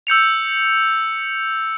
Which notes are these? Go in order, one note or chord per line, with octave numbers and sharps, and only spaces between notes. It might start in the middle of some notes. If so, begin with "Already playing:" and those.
E6 G6 C#7 F7